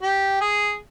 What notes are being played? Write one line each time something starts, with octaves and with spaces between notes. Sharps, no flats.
G4
G#4